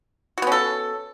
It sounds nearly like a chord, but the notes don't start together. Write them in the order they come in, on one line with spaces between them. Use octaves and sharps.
F#4 B3 C#4 A4